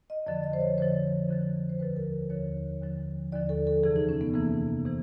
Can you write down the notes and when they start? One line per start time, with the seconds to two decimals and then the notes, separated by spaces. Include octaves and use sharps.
0.10 D#5
0.27 F2 D3 F3 D5
0.43 D#5
0.53 C5
0.61 C#5
0.78 F2 D3 F3 C5
1.29 F2 D3 F3
1.69 C5
1.79 D#2 D3 F3 B4
1.96 A#4
2.30 D#2 D3 F3 C#5
2.81 D#2 D3 F3
3.32 D#2 D3 F3 D5
3.49 A4
3.67 A4
3.83 F2 C3 E3 G#4
3.96 D#4
4.09 C#4
4.21 B3
4.34 F2 C3 E3 A#3
4.86 C3 E3